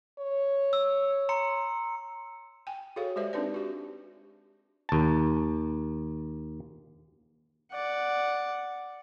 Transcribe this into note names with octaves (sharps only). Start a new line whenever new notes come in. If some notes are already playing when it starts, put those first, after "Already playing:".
C#5
E6
A#5 C6 C#7
G5 G#5
F#4 G#4 A4 C#5 F5
G#3 G4 C5 D5 E5
C4 D4 D#4 B4 D5
F#4 G4
D#2 A5
D5 F#5